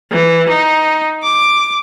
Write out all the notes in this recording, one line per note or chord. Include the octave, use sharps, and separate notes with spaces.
E3
D#4
D6